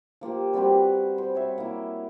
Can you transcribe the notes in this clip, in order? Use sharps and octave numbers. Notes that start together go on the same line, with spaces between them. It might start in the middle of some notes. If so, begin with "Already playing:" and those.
F3 A#3 F4 G4
G3 C4 F#4 B4
C5
C#5 E5
A#3 E4